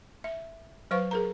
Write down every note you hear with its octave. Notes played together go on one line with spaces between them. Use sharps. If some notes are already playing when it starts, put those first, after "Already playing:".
E5
F#3 B4 C5 F5 C#6
G#4 A#4 A#5